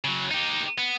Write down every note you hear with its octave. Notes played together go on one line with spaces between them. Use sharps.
C#3 F#3
D#4 G4
B3